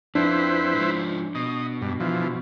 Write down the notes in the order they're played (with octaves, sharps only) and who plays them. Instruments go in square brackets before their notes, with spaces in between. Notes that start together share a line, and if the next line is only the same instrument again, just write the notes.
[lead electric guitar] F2 [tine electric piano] D4 [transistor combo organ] E4 B4 C5
[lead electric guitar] G#2 F3
[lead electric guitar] B2 [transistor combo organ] D#5
[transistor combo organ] G2
E3 F3